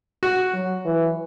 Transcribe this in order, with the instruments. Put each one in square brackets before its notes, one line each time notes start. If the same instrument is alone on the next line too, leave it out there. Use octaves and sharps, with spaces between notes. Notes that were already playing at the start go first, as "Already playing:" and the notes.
[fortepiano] F#4
[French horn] F#3
E3